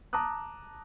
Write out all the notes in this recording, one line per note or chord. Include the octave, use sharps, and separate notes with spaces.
A5 A#5 D6 D#6 F#6